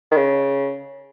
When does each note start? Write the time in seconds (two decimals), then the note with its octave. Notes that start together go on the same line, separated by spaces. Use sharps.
0.12 D#3
0.17 C#3